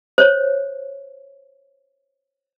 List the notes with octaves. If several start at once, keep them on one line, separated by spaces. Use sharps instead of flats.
C5 C#5